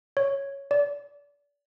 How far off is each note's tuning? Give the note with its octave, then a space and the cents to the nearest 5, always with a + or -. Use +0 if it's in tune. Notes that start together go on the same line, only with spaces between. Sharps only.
C#5 +0
D5 -30